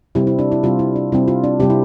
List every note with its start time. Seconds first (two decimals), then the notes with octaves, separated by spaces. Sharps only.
0.15 C3 G3 C4 E4
0.27 E4
0.39 D4
0.52 E4
0.63 C3 G3 C4 F4
0.79 E4
0.96 D4
1.12 C3 G3 C4 E4
1.28 F4
1.44 D4
1.60 C3 G3 C4 G4
1.70 E4